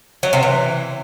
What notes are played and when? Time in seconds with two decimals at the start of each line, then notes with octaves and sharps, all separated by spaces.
0.23 F#3
0.33 C3
0.43 E3